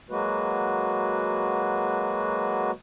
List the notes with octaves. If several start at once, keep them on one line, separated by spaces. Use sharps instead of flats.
F#3 G#3 A#3 F#4 B4